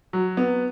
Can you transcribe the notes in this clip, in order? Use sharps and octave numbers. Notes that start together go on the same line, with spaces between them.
F#3
B3